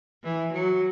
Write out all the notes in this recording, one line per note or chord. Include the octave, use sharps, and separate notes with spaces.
E3
F#3